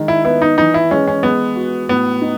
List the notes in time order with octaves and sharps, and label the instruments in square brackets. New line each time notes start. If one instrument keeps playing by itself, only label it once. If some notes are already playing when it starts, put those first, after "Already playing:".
Already playing: [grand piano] D#3 G#3
[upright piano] E4
[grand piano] B3 [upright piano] E4
[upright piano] D#4
[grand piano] E3 [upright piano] D#4
[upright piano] E4
[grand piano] G#3 [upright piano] C#4
[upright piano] C#4
[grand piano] G#3 [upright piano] B3
[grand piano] F#4
[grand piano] A2 [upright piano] B3
[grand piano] D#4